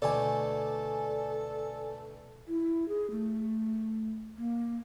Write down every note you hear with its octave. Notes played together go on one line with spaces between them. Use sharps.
D2 B2 A4 D5 G#5
E4
G#4
A3
A#3